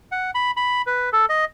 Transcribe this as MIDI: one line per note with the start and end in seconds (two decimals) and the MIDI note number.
0.12 0.31 78
0.35 0.51 83
0.57 0.82 83
0.87 1.09 71
1.13 1.26 69
1.30 1.45 75